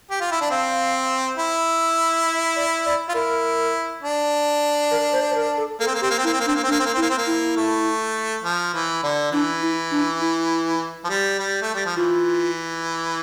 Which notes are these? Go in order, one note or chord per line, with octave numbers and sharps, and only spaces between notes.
G4
F4
E4
D4
C4 F5
E4
E5
D5
D5
F4
E4 A#4
D4
A#4
C5
C5
A#4
A4
A#3 A4
C4
A#3
C4 G4
A#3
C4
A#3 E4
C4
A#3
C4 D4
A#3
C4
A#3 D4
C4
A#3
C4
E4
A#3
C4
A#3
E4
A3
F3
E3
D3
E3 D4
E4
D4
E4
F3
G3
G3
A3
G3
F3
E3 F4